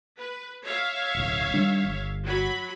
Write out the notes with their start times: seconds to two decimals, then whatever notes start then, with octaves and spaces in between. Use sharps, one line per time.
0.18 B4
0.64 C#5 E5 F5
1.15 D1 B1
1.54 D#3 G3 D4
1.84 G1
2.25 F#3 B5